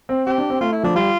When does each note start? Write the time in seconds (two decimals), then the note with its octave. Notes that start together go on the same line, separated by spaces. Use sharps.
0.09 C4
0.26 C4 G4
0.38 D4
0.50 C4
0.61 A3 F4
0.72 E4
0.83 F3 D4
0.95 G3 F4